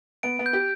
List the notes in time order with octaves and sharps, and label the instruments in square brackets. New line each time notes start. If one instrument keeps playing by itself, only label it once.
[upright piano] B3 [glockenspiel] D7
[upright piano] B3
[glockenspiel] G6
[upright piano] G4